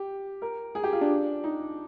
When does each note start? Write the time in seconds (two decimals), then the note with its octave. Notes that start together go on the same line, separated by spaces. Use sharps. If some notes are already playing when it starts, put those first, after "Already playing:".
Already playing: G4
0.42 A#4
0.75 G#4
0.83 G4
0.93 F4
1.01 D4
1.44 D#4